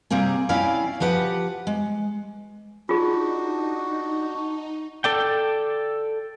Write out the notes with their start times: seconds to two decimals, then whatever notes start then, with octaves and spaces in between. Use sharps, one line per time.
0.10 C3 G3 A#3 C4 G#4
0.49 C#4 E4 D5 F5 G5
1.00 F3 G4 B4 F#5
1.67 G#3
2.89 D4 D#4 F4 F#4 G#4
5.04 A4 D5 G5